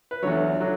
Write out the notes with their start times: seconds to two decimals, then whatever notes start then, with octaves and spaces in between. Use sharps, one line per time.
0.11 B4
0.22 E2 D3 F#3 C#5
0.60 D3 F#3